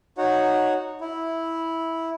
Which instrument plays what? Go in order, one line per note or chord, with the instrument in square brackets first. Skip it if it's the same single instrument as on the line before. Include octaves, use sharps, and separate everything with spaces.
[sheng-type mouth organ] D#4 F#4 C#5 F#5
E4